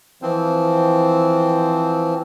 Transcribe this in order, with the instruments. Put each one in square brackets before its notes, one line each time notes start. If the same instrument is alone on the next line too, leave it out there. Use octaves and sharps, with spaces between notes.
[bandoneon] E3 F3 C4